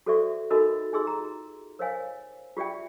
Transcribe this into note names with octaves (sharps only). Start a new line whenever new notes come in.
F#4 A4 C5 D5 E5 C#6
D#4 F#4 A4 A#4 D#5 B5
D#4 F4 G#4 D#5 C6 E6
A#5
A#4 C5 C#5 D#5 F5 G#5
F4 G4 D5 E5 G5